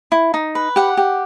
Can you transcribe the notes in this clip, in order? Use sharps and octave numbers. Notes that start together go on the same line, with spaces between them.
E4
D#4
B4
G4 F#5
G4